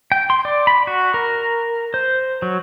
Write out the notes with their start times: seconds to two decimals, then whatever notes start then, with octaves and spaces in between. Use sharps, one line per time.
0.12 G5
0.30 C6
0.45 D5
0.67 B5
0.87 F#4
1.14 A#4
1.94 C5
2.42 F#3